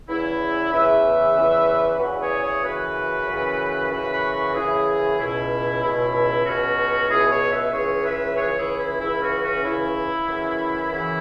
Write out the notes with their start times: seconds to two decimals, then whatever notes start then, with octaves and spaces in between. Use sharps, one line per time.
0.09 E2 C#3 E3 E4
0.72 E2 C#3 E3 B4 E5
1.37 E2 C#3 E3
2.00 E2 C#3 E3 F#4 B4
2.21 G#4 C#5
2.42 G#4 C#5
2.63 F#2 C#3 E3 F#4 B4
3.27 F#2 C#3 E3
3.91 F#2 C#3 E3 F#4 B4
4.12 F#4 B4
4.33 F#4 B4
4.54 F#2 C#3 E3 E4 G#4
5.18 C#2 B2 E4
5.82 C#2 B2 E4
6.45 C#2 B2 C#4 F#4
7.09 C#2 B2 E4 G#4
7.30 G#4 C#5
7.51 B4 E5
7.73 C#2 C#3 E3 G#4 C#5
8.04 B4 E5
8.36 C#2 C#3 E3 G#4 C#5
8.57 E4 G#4
8.79 E4
9.00 C#2 C#3 E3 E4
9.21 C#4 F#4
9.43 C#4 F#4
9.63 C#2 C#3 E3 E4
10.27 F#2 C#3 E3
10.91 F#2 C#3 E3 E4